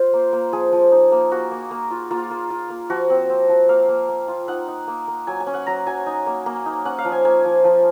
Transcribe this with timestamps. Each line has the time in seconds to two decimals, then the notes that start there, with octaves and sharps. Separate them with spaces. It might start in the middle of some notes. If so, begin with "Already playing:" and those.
Already playing: F4 C5
0.13 A#3
0.33 A#3
0.53 F3 G#4
0.72 F3
0.92 D#4
1.12 A#3
1.31 A#3 F#4
1.51 A#3
1.71 A#3
1.91 F4
2.11 A#3 F4
2.31 A#3
2.50 F4
2.70 A#3
2.90 F3 F#4
3.10 C4
3.30 C4
3.49 F3
3.69 A#3 F5
3.89 A#3
4.09 A#3
4.28 F4
4.48 D#4 F#5
4.68 D#4
4.88 A#3
5.08 A#3
5.27 F#3 G#5
5.40 G#5
5.47 C#4
5.54 F#5
5.67 F#3 A#5
5.86 F#3 G#5
6.06 D#4
6.26 A#3
6.46 A#3
6.66 D#4
6.85 C#4 F#5
6.99 F5
7.05 F3
7.12 G#5
7.25 A#3 G#5
7.45 F3
7.64 F3